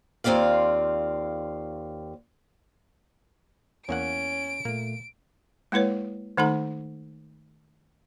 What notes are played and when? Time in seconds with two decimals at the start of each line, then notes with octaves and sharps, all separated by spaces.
0.24 D#2 C4 F4 D5 F5
3.89 E2 A#3 C#4 F#5 D7
4.65 A#2 A3 A#3
5.72 G#3 A#3 E4 B4 C#5
6.37 D#3 A3 D#4 A4 F#5 A#5